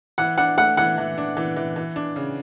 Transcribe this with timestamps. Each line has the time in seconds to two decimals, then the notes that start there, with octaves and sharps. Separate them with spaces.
0.18 E3 F#5
0.38 D4 F#5
0.57 A3 F#5
0.77 E3 F#5
0.98 E3
1.18 D4
1.37 E3
1.57 E3
1.76 E3
1.96 D4
2.16 C#3